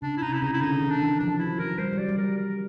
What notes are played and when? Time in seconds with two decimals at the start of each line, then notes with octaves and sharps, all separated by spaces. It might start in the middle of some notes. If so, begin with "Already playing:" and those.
0.02 C#3 D4
0.17 E4
0.22 C3 D#4
0.34 E4
0.42 C#3 D#4
0.53 E4
0.61 D3 D#4
0.80 D#3
0.91 D4
1.01 E3
1.20 F3 D4
1.39 F#3 E4
1.59 F#3 A#4
1.78 G3 C5
1.93 F#3
1.98 D5
2.08 G3
2.18 A#4
2.38 A#4